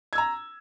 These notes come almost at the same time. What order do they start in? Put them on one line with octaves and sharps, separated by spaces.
G#6 E6 A#5